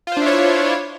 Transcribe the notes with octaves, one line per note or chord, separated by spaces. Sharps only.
D4 E4 F4 C5 C#5